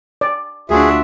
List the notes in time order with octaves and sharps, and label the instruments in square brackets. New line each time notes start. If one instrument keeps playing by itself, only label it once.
[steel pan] D5
[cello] D2 D4 [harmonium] F4 F#4 E5 [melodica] G#4